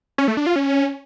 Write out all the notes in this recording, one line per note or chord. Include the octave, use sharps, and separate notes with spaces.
C#4
A3
D4
F4
C#4